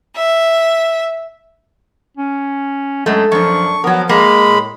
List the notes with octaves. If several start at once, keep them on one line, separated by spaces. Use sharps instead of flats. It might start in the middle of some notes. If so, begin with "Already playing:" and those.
E5
C#4
F#2 G#3 A3
F#2 F3 D4 C#6
F3 F#3 B3 A#4
G#3 A#3 B5
A2